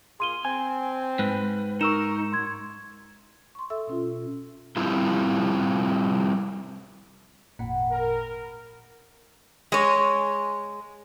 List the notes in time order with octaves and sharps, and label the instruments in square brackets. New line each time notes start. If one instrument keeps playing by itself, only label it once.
[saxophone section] A#3 F4 G#4 [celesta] C6 D#7 G7
[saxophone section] C4 [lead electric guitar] G#5
[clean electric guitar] G#2 [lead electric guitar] B4
[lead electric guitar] D#4 [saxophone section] A#4 [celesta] C#6 E6 E7
[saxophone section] F#2 [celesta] C6 G#6
[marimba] C6 C#6
A4 E5 E6
B2 C#4 F4
[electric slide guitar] G3 C4 E4 F4
[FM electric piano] G#1 F2 A#2 [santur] F#5 G5 B5
[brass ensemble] A#4
[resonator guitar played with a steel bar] G#3 C#5